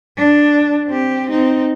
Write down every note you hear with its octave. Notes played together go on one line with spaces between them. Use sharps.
D4
C4 G4
C4 D#4